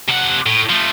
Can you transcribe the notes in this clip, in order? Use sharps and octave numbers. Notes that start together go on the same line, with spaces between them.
C3 F#5
A2
F3 A3